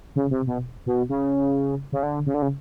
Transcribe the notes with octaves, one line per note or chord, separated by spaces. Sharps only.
C#3
C3
B2
B2
C#3
C#3
D3
C#3
D3
C#3